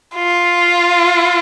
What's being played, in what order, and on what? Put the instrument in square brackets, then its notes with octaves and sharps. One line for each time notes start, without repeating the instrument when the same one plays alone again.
[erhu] F4